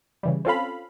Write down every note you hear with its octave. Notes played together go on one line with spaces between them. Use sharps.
C#3 E3 G3
C4 C#4 F4 A4 F5 B5